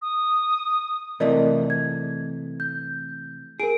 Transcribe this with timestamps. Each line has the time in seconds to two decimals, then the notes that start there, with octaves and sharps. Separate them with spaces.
0.02 D#6
1.20 C3 E3 A3 A#4 D5 D#5
1.70 G#6
2.60 G6
3.60 G#4 A#4 D7